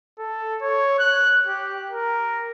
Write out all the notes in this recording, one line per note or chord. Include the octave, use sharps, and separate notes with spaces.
A4
C#5
F#6
G4
A#4